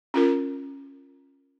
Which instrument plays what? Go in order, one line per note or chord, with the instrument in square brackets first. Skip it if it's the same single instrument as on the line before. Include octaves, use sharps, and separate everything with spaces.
[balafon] C#4 F4 A#4